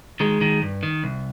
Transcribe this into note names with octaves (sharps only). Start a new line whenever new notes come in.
D#3 G#3
D#3
G2
D#3
C2